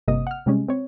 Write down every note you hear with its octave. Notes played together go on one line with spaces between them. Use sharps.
G1 C3 A#3 D#5 D#6
F#5 F6
C3 G3 G#3 C#4
C4 C#5